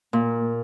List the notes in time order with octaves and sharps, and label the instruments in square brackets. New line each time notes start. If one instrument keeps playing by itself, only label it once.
[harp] A#2